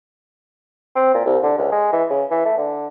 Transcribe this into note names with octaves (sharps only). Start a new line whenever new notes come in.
C4
A#2
C2
D3
C#2
G#3
E3
C#3
E3
A3
D3